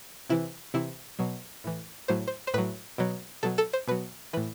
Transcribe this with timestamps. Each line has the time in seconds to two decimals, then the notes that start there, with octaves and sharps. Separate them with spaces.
0.29 C3 E3 E4
0.74 C3 E3 E4
1.19 B2 F#3
1.64 A2 E3
2.08 A2 F#3 C5
2.28 C5
2.47 C5
2.54 A2 F#3 B4
2.98 B2 F#3
3.43 B2 F#3 A4
3.58 A4
3.73 C5
3.88 B2 F#3 B4
4.33 E3 B4
4.37 A2